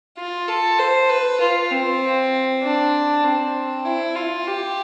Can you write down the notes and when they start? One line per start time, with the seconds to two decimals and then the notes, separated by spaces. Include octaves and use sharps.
0.18 F4
0.48 A4
0.78 C5
1.09 B4
1.40 F4
1.71 C4
2.62 D4
3.24 C4
3.85 E4
4.15 F4
4.47 G4